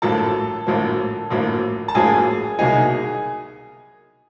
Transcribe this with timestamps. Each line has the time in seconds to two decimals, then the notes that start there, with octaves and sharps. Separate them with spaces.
0.02 A#1 A2 F#3 A#3 A4 A5
0.67 A#1 A2 F#3 A#3
1.30 A#1 A2 F#3 A#3
1.88 A5
1.95 A#1 A2 F#3 A#3 G#4 G#5
2.59 C2 B2 F#3 A#3 D#4 G#4 G#5